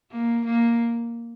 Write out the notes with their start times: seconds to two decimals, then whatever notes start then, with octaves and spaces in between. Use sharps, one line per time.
0.11 A#3
0.45 A#3